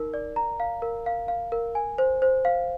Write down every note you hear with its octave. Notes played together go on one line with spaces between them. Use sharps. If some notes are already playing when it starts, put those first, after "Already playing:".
Already playing: D#4 A#4
D5
A#5
F5
A#4
F5
F5
A#4
G#5
C5
C5
F5